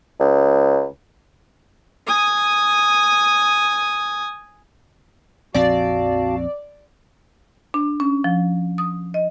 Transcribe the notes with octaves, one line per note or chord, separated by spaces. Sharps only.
C#2
G#5 D#6
A#1 F2 C4 F#4 D5 F5 A5
D4
C#4
F3
D#6
D#5